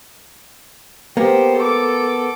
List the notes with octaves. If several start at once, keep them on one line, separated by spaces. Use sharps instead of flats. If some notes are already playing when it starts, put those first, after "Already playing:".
A#3 B3 G4 C5
A4 D6